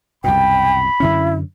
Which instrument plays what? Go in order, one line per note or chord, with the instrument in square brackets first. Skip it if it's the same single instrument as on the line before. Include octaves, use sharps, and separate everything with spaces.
[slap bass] C2 F#2 B2 [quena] G5 [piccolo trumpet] B5
[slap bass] F#2 D3 C#4 [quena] E4